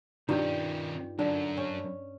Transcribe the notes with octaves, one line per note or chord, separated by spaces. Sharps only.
G2 D#3 C#4 D#4 F4 G4
F#2 D3 D4
C#4